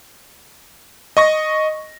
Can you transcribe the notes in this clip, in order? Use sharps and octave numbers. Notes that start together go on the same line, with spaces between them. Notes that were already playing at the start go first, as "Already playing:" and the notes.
D#5 C#6 A#6